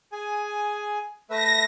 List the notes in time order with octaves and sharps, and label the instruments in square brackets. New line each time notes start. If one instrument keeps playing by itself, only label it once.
[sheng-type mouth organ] G#4 G#5
[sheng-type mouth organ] A3 B4 E5 [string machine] A#6